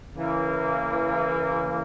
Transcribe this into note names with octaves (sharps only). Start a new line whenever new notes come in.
C#3 E3 A#3